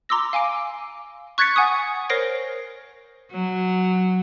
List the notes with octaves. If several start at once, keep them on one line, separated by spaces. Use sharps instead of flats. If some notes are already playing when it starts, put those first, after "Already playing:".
A#5 C6 D6 E6 A#6
F5 G#5 D6 D7
C#6 F#6 G#6 A6 B6 C#7
F#5 G#5 C#6 D#6
A#4 C5 C#5 A#6 C7 D7
F#3